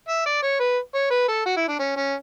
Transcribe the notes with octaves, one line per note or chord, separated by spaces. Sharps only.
E5
D5
C#5
B4
C#5
B4
A4
F#4
E4
D4
C#4
C#4